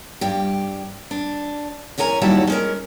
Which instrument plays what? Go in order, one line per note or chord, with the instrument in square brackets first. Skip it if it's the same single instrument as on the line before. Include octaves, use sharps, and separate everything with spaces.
[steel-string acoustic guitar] G2 G4
D4
E2 C#4 A#4 G#5 A#5
D#2 F#3 G3 E4 F#4 A5
G#3 C#4 A#4